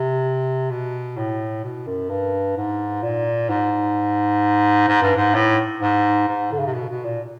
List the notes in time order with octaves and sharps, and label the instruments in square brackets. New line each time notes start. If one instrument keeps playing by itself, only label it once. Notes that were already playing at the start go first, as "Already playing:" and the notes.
Already playing: [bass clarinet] C3
B2
A2
B2
F#2
G2
G#2
A#2
G#2
G#2
G2
G#2
A2
G#2
G#2
D3
C#3
C3
B2
B2
A#2